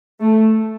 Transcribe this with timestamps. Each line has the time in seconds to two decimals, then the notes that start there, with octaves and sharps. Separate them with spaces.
0.20 A3